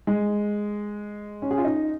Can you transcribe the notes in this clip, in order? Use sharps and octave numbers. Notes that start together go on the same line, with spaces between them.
G#3
C#4
G#4
F4
D#4